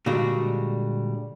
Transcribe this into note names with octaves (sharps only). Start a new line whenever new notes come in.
A#2 D3 G3 G#3 F#4